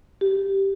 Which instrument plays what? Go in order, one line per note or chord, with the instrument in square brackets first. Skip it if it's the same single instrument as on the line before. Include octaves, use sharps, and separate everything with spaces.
[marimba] G4